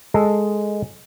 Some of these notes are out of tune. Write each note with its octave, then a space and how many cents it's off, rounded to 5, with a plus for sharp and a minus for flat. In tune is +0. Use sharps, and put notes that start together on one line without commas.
G#3 +0 A4 +0